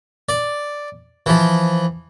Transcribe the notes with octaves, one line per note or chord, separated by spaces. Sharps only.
D5
E3 F3